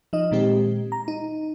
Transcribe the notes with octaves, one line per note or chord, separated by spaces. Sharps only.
F3 D#4 D#5
A#2 D#3 G#3 C4 G4
A#5
D#4